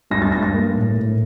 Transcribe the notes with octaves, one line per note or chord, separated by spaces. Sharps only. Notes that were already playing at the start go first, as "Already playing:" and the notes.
G2 A#6
A6
G2 A#6
A#6
A#3
A2
A2